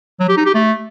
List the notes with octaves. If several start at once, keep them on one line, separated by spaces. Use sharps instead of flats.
F#3
G4
D#4
G4
A3